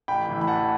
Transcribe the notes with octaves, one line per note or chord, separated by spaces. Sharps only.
A1 G5 B5
A2 E3
B5
A1 F#5 A5